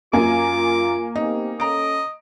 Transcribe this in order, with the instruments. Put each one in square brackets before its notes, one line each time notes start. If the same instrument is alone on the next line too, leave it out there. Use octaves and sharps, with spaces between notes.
[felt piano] F#2 [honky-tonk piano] A#3 G#5 [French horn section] F4 [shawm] D6
[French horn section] B3 C4 G4 [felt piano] D#4
[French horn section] C#4 A4 [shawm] D#5 [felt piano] A#5 D7